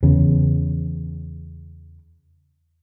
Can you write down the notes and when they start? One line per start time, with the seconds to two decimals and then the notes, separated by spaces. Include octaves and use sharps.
0.03 E2 C#3